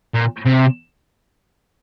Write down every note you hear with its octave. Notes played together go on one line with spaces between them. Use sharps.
A#2
C3